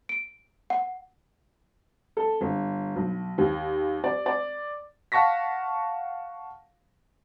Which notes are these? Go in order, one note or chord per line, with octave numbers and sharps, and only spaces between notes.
D7
F#5
A4
G1
B1
D#2
D5
D5
F5 F#5 A5 C#6 A#6 B6